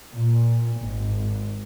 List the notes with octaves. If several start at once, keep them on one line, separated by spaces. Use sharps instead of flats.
A#2
G#1